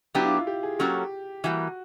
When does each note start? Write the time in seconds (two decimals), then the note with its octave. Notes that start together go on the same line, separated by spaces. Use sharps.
0.15 F#3 B3 D4 E4 G4
0.25 F4
0.37 F4
0.47 G4
0.63 G#4
0.79 F#3 A#3 C#4 F#4 G4 A4
1.44 E3 G3 A#3 F#4